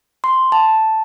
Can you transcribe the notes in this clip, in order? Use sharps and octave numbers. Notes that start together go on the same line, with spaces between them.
C6
A5